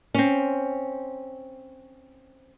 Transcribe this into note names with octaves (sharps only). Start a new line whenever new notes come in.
C4 C#4